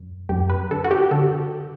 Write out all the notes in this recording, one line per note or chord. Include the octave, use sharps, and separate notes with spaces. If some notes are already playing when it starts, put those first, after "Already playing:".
Already playing: F#2
F#2 G4
B4
D3 A4
F#4
G4
D3 A4